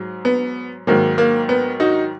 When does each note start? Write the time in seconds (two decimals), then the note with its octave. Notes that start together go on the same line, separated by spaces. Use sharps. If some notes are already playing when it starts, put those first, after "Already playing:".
Already playing: G#2 F#3
0.25 B3
0.87 G#2 D#3 F#3 A#3
1.18 A#3
1.49 B3
1.80 D#4 F#4